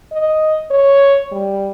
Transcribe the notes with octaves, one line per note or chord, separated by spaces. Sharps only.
D#5
C#5
G3